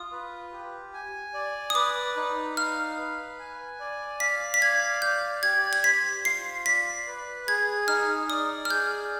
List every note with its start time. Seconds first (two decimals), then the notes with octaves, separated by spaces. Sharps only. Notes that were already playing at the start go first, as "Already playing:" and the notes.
Already playing: F4 D#6
0.12 B4
0.52 G4
0.93 G#5
1.34 D5
1.70 D#6
1.75 B4 D6
2.17 D#4
2.57 F5 F6
2.98 B4
3.39 G#5
3.80 D5
4.20 F5 B6
4.54 B6
4.62 D5 G#6
5.02 D5 G6
5.43 G4 G#6
5.73 G#6
5.84 C5 B6
6.25 F4 C7
6.66 D5 B6
7.07 B4
7.47 G#4 G#6
7.88 D#4 F6
8.30 D5 D#6
8.65 F6
8.70 G#4 G6